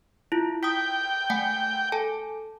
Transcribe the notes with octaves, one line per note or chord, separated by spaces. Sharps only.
E4 F4
G5 D#6 B6
A3 F#5 G#5
A4 G#5 A5